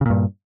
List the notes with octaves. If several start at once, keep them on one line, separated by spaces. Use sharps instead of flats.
G2 A#2 C#3